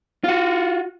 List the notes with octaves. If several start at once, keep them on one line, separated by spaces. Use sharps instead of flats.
F4 F#4